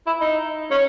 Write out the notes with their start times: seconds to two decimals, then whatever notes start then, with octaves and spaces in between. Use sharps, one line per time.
0.07 E4
0.21 D#4
0.71 C#4